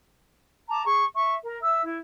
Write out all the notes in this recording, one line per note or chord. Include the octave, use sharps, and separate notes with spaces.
A5 A#5 D6
G#4 C#6
E5 C#6
A#4
E5 E6
E4